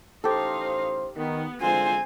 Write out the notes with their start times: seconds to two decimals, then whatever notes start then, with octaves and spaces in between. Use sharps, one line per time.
0.24 A1 D#4 G4 A4 C5 F5
1.17 D#3 B3
1.61 D3 G#3 C4 F4 C5 G#5